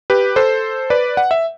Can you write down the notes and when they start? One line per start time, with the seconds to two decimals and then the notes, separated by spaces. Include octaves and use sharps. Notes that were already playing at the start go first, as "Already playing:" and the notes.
0.10 G4 B4
0.36 A4 C5
0.90 B4 D5
1.17 F#5
1.31 E5